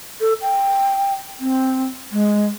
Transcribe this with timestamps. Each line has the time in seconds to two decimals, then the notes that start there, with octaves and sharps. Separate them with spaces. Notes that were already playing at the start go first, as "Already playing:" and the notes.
0.21 A4
0.42 G5
1.40 C4
2.12 G#3